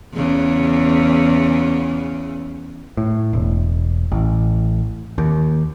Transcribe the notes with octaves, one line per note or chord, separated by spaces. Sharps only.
E2 C#3
A2
E1
A1
D#2